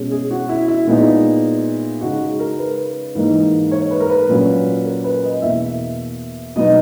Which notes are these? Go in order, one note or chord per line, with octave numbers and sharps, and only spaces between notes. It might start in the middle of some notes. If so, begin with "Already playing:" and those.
Already playing: B2 G#3 C#4
G#4
F#4
E4
E4
A#2 G#3 B3 D#4
C#3 G#3 D#4 F#4
G#4
A#4
B4
G#2 E3 A#3 D#4
C#5
B4
A#4
B4
A#2 F#3 C#4
A#4
B4
D#5
E2 B2 A#3 E5
B2 F#3 B3 D#4 D#5